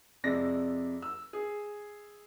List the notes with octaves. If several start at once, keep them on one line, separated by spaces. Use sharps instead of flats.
F2 C3 G#3 D5 A#6
E6
G#4